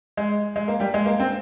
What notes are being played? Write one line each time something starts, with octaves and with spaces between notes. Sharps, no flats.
G#3
G#3
A#3
G3
G#3
A#3
C4